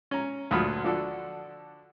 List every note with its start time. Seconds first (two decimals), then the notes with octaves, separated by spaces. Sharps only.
0.11 C#4 A#5
0.51 D2 A#2 F#3 F4 B5 D#6
0.84 D3 F3 D4 F#4 A4